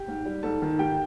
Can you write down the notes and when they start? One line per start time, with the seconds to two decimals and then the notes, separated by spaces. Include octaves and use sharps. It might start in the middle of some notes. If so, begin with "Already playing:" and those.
Already playing: G4
0.08 G#2
0.25 G3
0.43 G#2 A4 A5
0.62 D#3
0.79 G#2 G4 G5